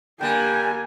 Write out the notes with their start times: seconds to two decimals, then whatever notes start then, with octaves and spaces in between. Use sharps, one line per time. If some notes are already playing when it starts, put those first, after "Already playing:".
0.21 D3 G3 A#3 G5 G#5